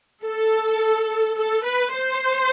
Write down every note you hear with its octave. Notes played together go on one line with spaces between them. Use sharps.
A4
A4
B4
C5